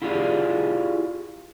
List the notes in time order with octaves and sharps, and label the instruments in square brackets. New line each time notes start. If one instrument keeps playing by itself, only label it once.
[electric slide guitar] E4 F4 G4 G#4 A#4 D5